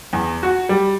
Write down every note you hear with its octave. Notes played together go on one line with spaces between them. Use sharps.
E2
F#4
G3